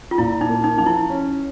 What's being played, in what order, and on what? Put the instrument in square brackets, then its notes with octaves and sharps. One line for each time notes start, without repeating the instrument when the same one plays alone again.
[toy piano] F4
[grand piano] A#2 [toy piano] E4
[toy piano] D#4
[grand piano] A#3
[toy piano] D#4
[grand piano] F3 [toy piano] D#4
[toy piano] E4
[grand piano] C#4